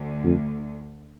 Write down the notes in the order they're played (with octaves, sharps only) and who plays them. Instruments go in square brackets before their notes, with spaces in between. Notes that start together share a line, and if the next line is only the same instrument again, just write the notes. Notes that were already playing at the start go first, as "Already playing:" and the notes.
Already playing: [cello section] D2 D3
[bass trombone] F2